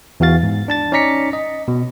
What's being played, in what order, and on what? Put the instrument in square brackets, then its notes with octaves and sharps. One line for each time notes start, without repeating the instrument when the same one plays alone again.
[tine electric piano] E2 E3 F#4 F5 A6
G#2
D4 A5 A6
C#4 D#4 D5 A#5 B6 C#7
D#5
B2